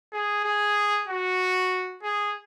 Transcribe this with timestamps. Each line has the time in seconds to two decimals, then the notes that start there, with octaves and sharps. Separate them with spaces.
0.13 G#4
0.44 G#4
1.08 F#4
2.03 G#4